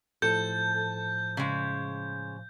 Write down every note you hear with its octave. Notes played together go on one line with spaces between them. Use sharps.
A2 F3 A4 C5 G6
C#3 G#3